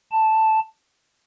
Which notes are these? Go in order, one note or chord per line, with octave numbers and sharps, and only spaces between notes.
A5